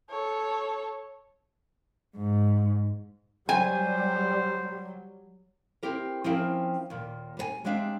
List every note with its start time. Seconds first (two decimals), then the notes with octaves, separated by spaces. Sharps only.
0.10 A4 C#5
2.17 G#2
3.49 F#3 G3 C5 G#5
5.83 C4 E4 G4 A#4
6.24 F3 C4 C#4 E4 A#4 F5
6.90 D#2 A#2
7.37 G3 B4 G#5
7.64 G3 G#3 C4 D4 E5 F5